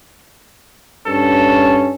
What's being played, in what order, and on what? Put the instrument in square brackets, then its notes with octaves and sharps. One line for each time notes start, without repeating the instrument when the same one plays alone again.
[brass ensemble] G2 C#4 [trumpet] A4